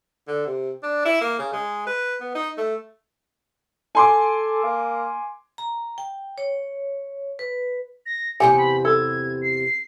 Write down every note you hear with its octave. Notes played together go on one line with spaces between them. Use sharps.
D3
C3
D4
E4
A#3
C#3
G#3
B4
B3
D#4
A3
A4 G#5 C6 D6
A#3
A#5
G5
C#5
B4
A#6
E2 C3 G4 G#5 C#7
B5
A4 G#6
C7